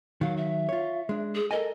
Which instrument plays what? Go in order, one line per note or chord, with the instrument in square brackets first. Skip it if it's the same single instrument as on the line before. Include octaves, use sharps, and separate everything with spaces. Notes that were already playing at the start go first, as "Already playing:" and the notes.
[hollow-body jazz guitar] D#3 F#3 [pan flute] F5
[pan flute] E5
[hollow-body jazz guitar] F4 C#5
G#3 D4
[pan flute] G#4
[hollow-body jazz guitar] A4 A#4 G#5 [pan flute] D#5